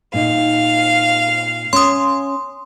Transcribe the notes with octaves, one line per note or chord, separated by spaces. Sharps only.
A#2 D#4 F5
C#4 C6 D#6